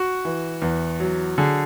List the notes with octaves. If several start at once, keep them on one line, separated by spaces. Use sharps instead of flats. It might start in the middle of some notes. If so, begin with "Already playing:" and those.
Already playing: F#4
E3
E2
F#3
D3 G#4